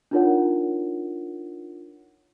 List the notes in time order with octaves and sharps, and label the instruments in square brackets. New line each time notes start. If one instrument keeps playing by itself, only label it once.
[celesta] D4 D#4 F4 A#4 C#5 F#5